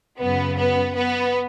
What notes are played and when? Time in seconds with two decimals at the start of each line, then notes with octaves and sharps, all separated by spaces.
0.20 F#2 C#3 F#3 B3
0.58 B3
0.95 B3